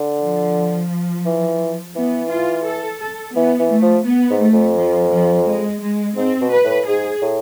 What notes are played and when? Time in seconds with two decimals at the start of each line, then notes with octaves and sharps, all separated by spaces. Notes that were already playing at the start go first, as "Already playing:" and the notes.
Already playing: D3
0.21 F3
1.26 E3
1.96 E3 B3
2.31 F4
2.66 A4
3.02 A4
3.36 E3 B3
3.60 E3
3.72 A3
3.83 F3
4.06 B3
4.30 G#2
4.41 A3
4.53 F2
4.77 F3
5.12 F3
5.48 G#3
5.83 G#3
6.17 G#2 C4
6.41 B2
6.52 B4
6.64 A2
6.87 G#2 G#4
7.22 A2